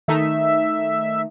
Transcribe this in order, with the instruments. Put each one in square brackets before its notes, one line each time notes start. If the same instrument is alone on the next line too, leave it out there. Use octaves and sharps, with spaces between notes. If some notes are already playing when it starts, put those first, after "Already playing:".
[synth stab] D#3 A3 D#4 [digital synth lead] E5